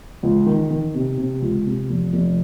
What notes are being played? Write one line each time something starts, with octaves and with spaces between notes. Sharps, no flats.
C#2
D#3
D#3
C3
C3
C#2
C3
F1
F1